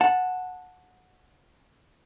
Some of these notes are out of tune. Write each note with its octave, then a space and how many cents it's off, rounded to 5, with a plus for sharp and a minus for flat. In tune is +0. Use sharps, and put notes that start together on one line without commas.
F#5 -10 A5 +0